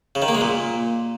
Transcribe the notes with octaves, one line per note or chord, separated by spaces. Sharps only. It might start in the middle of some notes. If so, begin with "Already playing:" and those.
C#3
D#3
A#3
G#3
A#2